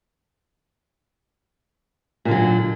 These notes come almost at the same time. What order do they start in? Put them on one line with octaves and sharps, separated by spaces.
A#2 D3 F#3